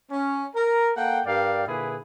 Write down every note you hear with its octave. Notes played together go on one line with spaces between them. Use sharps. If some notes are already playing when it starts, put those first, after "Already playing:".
C#4
A#4
A#3 A4 F#5 G5
G2 A#4 D5 F5 G5
A#2 D3 E4 G#4 B4